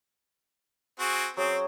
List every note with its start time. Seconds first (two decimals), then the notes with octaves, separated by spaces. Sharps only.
1.00 C4 F#4 G#4
1.37 F#3 C4 C#4 G#4